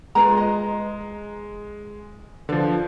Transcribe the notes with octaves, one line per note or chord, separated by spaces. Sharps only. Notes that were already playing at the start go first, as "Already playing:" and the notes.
G#3 F4 B4 A#5
D#5
D3 F3 B4 D5